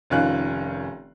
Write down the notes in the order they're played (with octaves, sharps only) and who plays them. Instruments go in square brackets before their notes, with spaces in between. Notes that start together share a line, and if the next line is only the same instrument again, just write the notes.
[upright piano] F1 D#3 C#4 F4 F#6